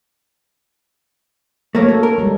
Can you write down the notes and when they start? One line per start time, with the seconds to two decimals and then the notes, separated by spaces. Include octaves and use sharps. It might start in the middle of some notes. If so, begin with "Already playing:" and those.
1.75 F#3 A3 A#3 C#5
1.88 A4
2.03 A#4
2.18 G3 G#3